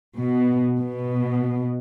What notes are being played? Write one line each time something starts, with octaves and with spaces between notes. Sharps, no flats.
B2
B2